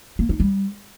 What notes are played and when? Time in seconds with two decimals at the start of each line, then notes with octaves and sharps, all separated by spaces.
0.19 A#3
0.29 D#4
0.40 G3